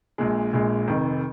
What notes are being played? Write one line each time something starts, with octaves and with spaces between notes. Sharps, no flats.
A#1 A#2 G#3
A#1 A#2 G#3
F1 F2 D#3